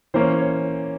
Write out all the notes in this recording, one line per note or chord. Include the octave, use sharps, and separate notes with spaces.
E3 A#3 C#4 C5
C#5